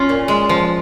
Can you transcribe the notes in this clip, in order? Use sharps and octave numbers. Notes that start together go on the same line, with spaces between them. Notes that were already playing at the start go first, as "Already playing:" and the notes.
Already playing: C#4 F4
A#2
G#3
F3